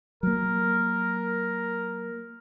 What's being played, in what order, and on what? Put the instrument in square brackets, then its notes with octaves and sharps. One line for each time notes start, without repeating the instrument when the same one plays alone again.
[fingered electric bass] F#3 A#3 [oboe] A#4